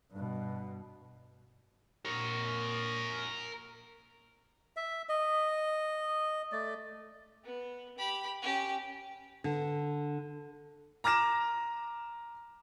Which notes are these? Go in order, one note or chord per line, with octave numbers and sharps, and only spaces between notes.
G2 B2
A#2 A#4 C#5
E5
D#5
A3 D5
B3
G4 B5
C#4 G4
D3
A#5 D6 F6 A#6 E7